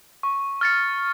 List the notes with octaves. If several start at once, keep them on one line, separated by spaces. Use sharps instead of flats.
C#6
F6 A6 C#7